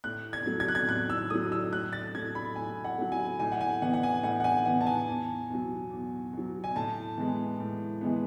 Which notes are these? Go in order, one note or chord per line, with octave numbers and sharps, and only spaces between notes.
A2 F#6
G#6
F#3 A3
G#6
F#6
G#6
A2 F#6
E6
F#3 A3 D#6
E6
A2 F#6
A6
F#3 A3 G#6
B5
A2 G#5
F#5
F#3 A3
G#5
A2 G#5
F#5
G#5
E3 B3 F#5
F#5
G#5
A2 F#5
F#5
G#5
E3 B3 F#5
A5
G#5
E2
B2 F#3
E2
B2 F#3
G#5
A2 A5
E3 G#3 B3
A2
E3 G#3 B3